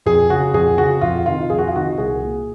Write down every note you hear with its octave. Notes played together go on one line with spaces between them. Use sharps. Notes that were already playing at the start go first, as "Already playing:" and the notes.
F2 G#4
C#3 F#4
F2 G#4
C#3 F#4
F2 F4
C3 D#3 F4
F2 G#4
F#4
F4
C3 D#3 F#4
C2 G#4
A#2